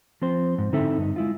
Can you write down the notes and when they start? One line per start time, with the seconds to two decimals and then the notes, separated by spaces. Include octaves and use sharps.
0.22 F3 C4 C5
0.58 G#2
0.73 D3 C4 D#4 E4 A4 E5
0.98 G2 D#4
1.16 G#3 E4 F4